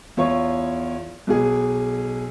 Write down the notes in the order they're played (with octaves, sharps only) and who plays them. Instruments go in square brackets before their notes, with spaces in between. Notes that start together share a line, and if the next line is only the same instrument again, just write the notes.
[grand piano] E2 F4 C#5
B1 B2 G#4